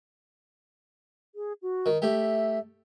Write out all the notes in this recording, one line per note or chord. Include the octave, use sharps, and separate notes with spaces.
G#4
F#4
D#3
A3 G4 E5